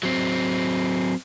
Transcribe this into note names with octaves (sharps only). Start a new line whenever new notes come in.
F#3 C4